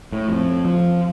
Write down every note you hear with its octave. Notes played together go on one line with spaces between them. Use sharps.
A2
F2
F3